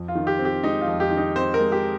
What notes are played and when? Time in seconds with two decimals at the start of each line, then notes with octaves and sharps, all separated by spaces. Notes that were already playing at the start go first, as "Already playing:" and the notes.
Already playing: F2
0.08 F4
0.15 D#3
0.27 G4
0.39 C4
0.45 G4
0.63 G#3 D#4
0.81 F4
0.87 F2
1.00 G4
1.11 D#3
1.17 D#4
1.36 C4 C5
1.54 A#4
1.59 G#3
1.72 G4